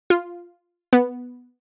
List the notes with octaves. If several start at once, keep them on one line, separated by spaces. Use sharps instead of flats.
F4
B3